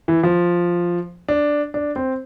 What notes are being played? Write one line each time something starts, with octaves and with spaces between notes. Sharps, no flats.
E3
F3
D4
D4
C4